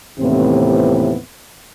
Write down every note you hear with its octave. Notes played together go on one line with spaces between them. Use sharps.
D#2 A2 C3 E3 B3 C4